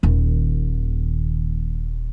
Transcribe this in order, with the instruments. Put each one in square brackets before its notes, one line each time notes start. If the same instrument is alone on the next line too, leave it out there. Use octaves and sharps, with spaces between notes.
[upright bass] D#1 D#2